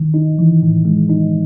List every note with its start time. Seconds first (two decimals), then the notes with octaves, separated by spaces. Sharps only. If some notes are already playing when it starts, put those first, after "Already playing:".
Already playing: D#3
0.14 D#4
0.39 E3
0.63 A2
0.85 G#3
1.10 D#4